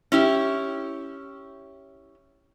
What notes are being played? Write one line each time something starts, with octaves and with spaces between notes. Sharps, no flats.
C#4 E4 G4